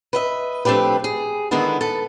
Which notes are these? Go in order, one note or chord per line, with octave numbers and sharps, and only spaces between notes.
B4 D#5 E5
F3 A3 C4 D4 G4 B4
G#4
D3 D#3 G#3 A3 B3 E4
A4 B4